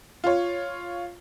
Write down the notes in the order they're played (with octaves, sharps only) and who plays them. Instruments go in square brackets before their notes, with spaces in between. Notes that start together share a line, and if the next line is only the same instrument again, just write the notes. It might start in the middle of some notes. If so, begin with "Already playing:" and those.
[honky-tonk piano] F4 C#5